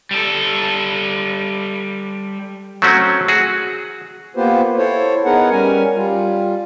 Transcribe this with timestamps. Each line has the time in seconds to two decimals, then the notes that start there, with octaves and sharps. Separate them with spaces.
0.11 G3 A4
2.82 F#3 A3 C4 C#4 F#4
3.28 F#4 G#4
4.36 A#3 B3 F4 G4 B4 C5
4.77 E4 A4 C5 C#5
5.25 B3 D#4 G#4 A#4 B4 F#5
5.51 G3 C#4 A#4 G#5
5.95 G3 F4